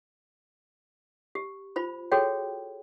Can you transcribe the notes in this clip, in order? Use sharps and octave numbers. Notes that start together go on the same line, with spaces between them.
G4
F4 C5 B5
F#4 G#4 A4 C#5 G5